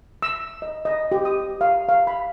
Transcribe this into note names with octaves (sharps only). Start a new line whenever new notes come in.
E6
D#5
D#5
G4
D#6
F5
F5
B5